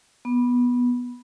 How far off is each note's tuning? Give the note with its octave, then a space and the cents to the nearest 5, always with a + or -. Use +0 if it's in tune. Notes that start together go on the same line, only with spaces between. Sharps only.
B3 -10